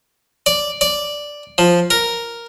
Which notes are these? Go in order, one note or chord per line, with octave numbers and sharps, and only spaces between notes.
D5
D5
F3
A#4